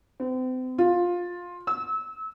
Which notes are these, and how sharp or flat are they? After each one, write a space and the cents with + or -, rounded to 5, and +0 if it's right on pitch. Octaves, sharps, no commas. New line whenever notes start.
C4 -40
F4 +15
E6 -30